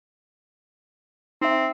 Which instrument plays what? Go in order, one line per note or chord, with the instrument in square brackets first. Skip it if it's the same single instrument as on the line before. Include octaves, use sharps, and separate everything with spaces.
[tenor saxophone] C4 [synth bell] D#4 E5